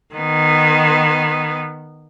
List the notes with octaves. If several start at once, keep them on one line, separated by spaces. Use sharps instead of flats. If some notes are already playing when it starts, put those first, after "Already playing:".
D#3 B3